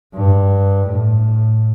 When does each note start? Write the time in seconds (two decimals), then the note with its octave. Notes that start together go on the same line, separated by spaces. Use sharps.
0.13 G2
0.87 A2